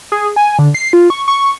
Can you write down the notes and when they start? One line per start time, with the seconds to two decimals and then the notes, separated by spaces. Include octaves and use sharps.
0.12 G#4
0.36 G#5
0.59 D3
0.74 C7
0.93 F4
1.10 C#6
1.28 C#6